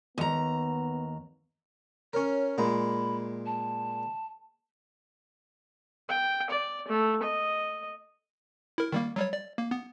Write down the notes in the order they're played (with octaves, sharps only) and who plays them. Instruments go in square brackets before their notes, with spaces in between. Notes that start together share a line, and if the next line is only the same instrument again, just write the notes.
[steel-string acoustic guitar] D#2 A#5 [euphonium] B3
[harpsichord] C#4 A#4 [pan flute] C#5
[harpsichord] A#2 G#3 A#5 [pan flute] B5
[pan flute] A5
[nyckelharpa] G5
D5
A3
D#5
[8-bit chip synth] E4 A#4
D#3 G3 A#3
F#3 G3 C#5
D5
A#3
B3